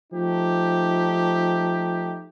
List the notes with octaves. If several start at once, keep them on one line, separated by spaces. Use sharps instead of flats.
F3 A3 D#4 G4